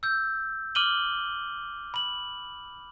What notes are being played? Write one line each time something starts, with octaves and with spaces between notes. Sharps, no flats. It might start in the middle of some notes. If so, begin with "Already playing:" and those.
E6 G6
D6 F6 D#7 F#7 G7
B5 F#7